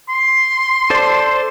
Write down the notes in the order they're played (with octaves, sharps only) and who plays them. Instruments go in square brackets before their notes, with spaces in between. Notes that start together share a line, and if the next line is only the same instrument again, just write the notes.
[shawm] C6
[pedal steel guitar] A4 C5 D5